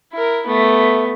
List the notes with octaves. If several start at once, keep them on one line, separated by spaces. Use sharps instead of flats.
E4 A#4
A3 B3